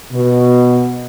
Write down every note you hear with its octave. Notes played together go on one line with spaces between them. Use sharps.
B2